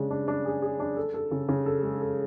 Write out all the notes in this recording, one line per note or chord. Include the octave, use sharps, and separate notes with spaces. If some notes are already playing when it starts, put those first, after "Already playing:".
Already playing: C#3 G#3 D4
D4
D4
G#4
G#4
D4
A4
A4
C#3
C#3
A4
G#3
A4